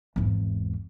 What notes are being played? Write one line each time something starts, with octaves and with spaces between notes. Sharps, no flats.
G#1 E2